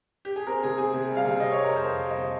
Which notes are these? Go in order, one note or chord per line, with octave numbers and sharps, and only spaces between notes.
G4
G#4
C4 A#4
C3 G#4
C4 G#4
C3 G#4
G3
F5
C3
C4 D#5
G3 C#5
A#4
F2 C5
F2
G3
D#5
C3